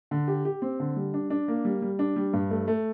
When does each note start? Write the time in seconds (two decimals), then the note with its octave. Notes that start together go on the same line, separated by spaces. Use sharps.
0.11 D3
0.28 G4
0.45 G4
0.62 C4
0.80 D3
0.96 G3
1.14 D4
1.30 D4
1.48 A#3
1.65 G3
1.82 G3
1.99 D4
2.16 G3
2.33 G2
2.50 A3
2.68 A3